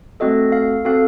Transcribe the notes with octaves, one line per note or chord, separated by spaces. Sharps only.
A3 C4 F#4 A4 D#5
F5
C4 F#4 A4 F5